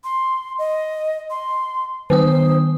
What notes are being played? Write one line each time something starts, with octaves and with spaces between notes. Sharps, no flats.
C6
D#5
C6
D#3 B3 C5 D#6